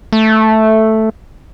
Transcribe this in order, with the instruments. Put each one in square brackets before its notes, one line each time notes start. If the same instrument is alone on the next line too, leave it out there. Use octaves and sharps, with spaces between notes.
[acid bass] A3